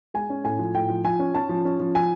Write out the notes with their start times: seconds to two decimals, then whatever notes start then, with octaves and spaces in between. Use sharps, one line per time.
0.14 G#3 G#5
0.30 C#4
0.44 A2 G#5
0.59 F3
0.75 A2 G5
0.90 F3
1.04 F3 G#5
1.19 C#4
1.34 C#4 A5
1.49 F3
1.65 C#4
1.80 F3
1.95 F3 G#5